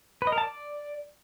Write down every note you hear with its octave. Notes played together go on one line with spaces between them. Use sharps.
B4
D#5
A#4
A5
D5